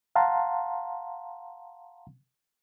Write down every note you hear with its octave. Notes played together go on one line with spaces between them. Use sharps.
F5 F#5 A5 A#5 C6